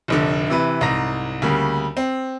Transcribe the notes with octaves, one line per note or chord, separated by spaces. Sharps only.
F1 A#1 D3
C3 E3 B4
C2 G#2 A#5 A#6
D2 C#3 G3 A#3
C4